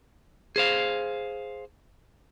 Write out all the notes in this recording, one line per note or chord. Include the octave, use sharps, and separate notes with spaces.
G#4 C5 F5